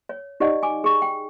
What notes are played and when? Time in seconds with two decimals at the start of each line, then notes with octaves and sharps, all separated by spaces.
0.09 C#5
0.40 D#4 G4 D5 D#5 F#5
0.63 G#5 D6
0.84 G#4 C#6
1.02 G5